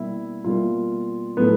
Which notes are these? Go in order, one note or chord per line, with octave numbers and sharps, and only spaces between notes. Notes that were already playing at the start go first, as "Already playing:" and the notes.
Already playing: B2 G3 A#3 E4
B2 G3 A#3 F4
A2 F#3 A3 B3